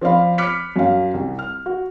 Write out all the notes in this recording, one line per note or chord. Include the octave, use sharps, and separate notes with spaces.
F3 C4 D5 F5 B5
B5 D6 F6 F#6 B6 C#7
F#2 F5
C2
F6
F#4